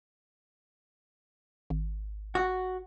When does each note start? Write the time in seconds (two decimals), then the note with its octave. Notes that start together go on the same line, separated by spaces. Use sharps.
1.70 G#1
2.35 F#4